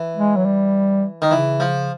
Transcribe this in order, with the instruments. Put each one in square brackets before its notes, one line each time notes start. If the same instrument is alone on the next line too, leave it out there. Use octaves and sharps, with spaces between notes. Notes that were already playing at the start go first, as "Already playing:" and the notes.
Already playing: [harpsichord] E3
[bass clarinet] G#3
F#3
G3
[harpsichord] D#3
[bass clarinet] C#3 [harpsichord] E3
[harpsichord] F3